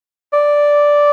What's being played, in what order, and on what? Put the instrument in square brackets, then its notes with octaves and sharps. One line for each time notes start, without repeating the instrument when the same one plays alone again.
[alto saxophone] D5